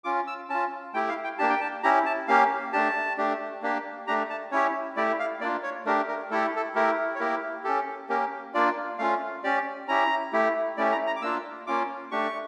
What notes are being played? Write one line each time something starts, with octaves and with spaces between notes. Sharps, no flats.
C#4 F4 D6
E6
C#4 F4 A5
A3 E4 G4 G5
F5
G5
A#3 D4 G4 A5
G5
A5
C#4 E4 G4 A#5
A5
A#3 C#4 G4 F5
A3 D4 G4 A5
A3 D4 G4
A#3 D4 G4
A3 D4 G4 A#5
A5
C#4 E4 G4 C#5
A3 E4 G4 D5
F5
A#3 D4 F4 D5
C#5
A3 D4 G4 A#4
A#4
A3 E4 G4 A4
A4
A3 E4 G4 A#4
C#5
A#3 E4 G4 A#4
C#4 G4 A4
A#3 C#4 G4 A#4
A#3 D4 F4 D5
A3 C#4 F4 F5
C#4 G4 D5
C#4 E4 G4 A#5
A3 E4 G4
A3 C#4 E4 G4 D5
A#5
A#5
D6
A#3 D4 F4 E6
A#3 C#4 F4 D6
A3 D4 G4 C#6